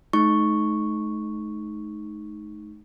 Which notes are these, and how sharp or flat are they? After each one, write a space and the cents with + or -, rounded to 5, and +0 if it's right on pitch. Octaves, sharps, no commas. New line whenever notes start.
A3 -40 D#4 +0 C#6 +0